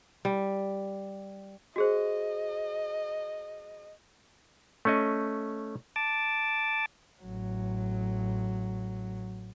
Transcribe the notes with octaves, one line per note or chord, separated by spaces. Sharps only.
G3
F#4 G#4 C5 D#5
A3 C#4 D#5
A5 D6
A1 F#3